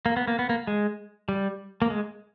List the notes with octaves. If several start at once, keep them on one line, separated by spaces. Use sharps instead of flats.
A#3
B3
A#3
B3
A#3
G#3
G3
A#3
G#3